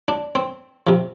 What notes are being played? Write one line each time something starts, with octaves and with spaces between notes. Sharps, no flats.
D4
C4
C3 F3